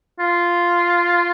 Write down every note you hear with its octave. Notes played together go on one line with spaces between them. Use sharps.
F4